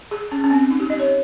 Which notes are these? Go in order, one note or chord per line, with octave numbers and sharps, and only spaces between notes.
G#4
C#4
C#4
C4
D#4
G4
D#5
C#5